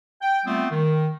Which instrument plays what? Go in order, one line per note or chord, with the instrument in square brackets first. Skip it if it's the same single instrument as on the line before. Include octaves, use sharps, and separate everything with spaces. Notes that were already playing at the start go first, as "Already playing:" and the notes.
[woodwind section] G5
G3 A3 B3 C4 F4
D#3